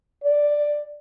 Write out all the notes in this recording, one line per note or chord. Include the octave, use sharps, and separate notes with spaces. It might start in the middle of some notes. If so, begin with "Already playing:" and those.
D5